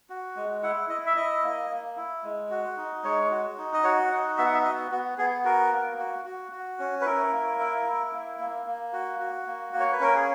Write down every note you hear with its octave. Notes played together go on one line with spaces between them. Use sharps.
F#4
G#3
E4 F#5
E4 D#5
E5
E4 D#5
A#3
A#3
E4
G#3
F#4
D#4
G#3 C#5
F#4
D#4
D#5
F#4 C#5
D#4 F#5
B3 E5
F#5
E5
F#4 D#5
B3 F#4
B3 G#4
F#4 A#4
A#3
F#4
F#4
F#4
C#4
B4
E4 A#4
A#3
E4
E4
A#3
A#3
A#3
F#4
F#4
A#3
A#3
C#5
B4
C#4 A#4
G#4